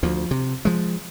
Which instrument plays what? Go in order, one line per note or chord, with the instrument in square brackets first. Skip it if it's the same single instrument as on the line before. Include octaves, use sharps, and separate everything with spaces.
[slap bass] D2 F3
C3
F3 G#3